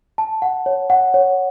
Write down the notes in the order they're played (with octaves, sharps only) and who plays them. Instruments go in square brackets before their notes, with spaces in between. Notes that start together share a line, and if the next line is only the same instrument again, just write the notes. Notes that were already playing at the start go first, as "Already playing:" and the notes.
[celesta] A5
F#5
C#5
F#5
C#5